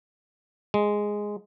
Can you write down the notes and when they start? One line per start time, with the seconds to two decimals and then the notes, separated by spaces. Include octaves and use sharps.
0.74 G#3